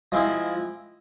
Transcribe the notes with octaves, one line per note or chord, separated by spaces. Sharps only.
F3 G#3 C4 E4